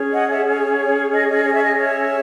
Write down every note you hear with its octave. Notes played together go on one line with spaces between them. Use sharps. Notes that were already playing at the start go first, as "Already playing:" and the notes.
Already playing: C#4 G#4 C#5
D#5 F#5
C#5 E5
C#5
D#5
D#5
C#5
E5
D#5
C#5 E5